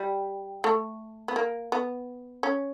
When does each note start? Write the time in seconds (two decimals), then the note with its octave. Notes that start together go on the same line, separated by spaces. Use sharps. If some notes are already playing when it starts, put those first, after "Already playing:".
Already playing: G3
0.64 A3
1.28 B3
1.36 A#3
1.72 B3
2.43 C#4